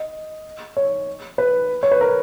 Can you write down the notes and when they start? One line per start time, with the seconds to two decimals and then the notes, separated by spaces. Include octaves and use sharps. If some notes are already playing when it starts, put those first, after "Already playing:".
Already playing: D#5
0.77 C#5
1.38 B4
1.83 C#5
1.92 B4
2.01 A#4